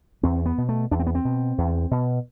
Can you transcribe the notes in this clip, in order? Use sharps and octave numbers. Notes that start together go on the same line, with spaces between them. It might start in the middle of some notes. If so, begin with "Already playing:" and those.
E2 C4
B3
B2
A3
E2 D4
C4
B3
C4
B2
E2
B2